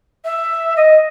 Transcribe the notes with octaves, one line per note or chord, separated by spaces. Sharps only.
E5
D#5